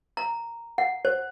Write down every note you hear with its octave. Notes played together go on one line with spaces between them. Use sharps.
A#5
F#5
C5